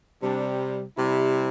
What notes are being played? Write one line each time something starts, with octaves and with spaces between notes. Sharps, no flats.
C3 G3 D4
C3 G3 E4